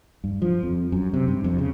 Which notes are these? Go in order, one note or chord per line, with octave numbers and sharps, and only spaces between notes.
G2
F3
F2
F#2
C3
G2
F2
C#3